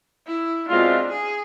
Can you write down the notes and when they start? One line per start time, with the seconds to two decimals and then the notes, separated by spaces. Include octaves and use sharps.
0.27 E4
0.69 B2 G#3 C4 D4 F4
1.12 G#4